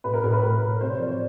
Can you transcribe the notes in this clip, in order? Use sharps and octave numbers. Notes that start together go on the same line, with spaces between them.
A2 B4
A#4
A2 A#4
B4
A2
A2
C3 C5
C#5
F3 D5
C#5